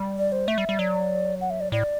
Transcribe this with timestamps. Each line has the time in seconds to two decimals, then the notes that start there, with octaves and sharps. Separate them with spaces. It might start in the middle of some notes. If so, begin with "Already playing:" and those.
Already playing: G3
0.17 D5
0.32 C5
0.48 A3 E5
0.58 G3
0.69 G3
0.79 F#3 D5
1.41 F#5
1.50 E5
1.61 D5
1.72 A2 D5